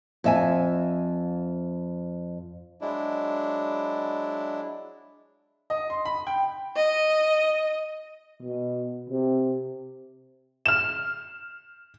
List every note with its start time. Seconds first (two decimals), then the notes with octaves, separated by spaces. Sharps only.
0.24 F2 E5 G#5
2.81 F#3 G#3 D4 E4
5.70 D#5
5.90 C6
6.05 B5
6.27 G5
6.76 D#5
8.42 B2
9.10 C3
10.66 F6 E7